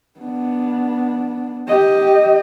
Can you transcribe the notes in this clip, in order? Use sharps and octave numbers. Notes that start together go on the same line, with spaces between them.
B3 D4
G4 D#5